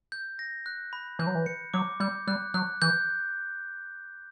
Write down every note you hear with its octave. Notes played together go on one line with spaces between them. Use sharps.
G6
A#6
F#6
B5
E3 G6
F#3
E3
C#7
F#3 D6
G3 G6
G3 F#6
F#3 F#6
E3 G6